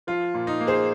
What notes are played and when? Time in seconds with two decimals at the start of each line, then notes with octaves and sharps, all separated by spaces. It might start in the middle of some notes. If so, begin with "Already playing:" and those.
0.07 F3 F4
0.34 A#2
0.47 D#4
0.60 A#3
0.67 G#4 C5